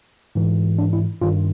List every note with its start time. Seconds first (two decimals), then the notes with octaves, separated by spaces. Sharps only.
0.35 G#2 E3
0.78 D4
0.93 E4
1.21 G2 D#3 F4